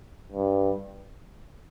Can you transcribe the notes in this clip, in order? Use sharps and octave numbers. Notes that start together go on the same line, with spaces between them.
G2